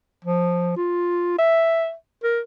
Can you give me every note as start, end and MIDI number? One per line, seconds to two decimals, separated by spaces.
0.25 0.76 53
0.77 1.37 65
1.38 1.94 76
2.24 2.41 70